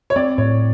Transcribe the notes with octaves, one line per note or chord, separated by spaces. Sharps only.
C#5
C4 D5
A2 C#5